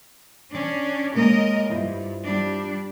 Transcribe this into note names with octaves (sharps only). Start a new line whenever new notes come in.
C#4 D4
G#3 A#3 A#4 C#5 D#5
G2 E4 F4 C5
G3 D4